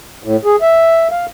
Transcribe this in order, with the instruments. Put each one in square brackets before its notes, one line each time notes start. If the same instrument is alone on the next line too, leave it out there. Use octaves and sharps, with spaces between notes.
[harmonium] A2
G#4
E5
F5